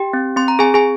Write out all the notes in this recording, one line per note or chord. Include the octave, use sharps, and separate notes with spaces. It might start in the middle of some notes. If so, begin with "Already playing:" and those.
Already playing: G4 G5
C4
C4 C6
A#5
C4 G#4 G#5
G#4 G#5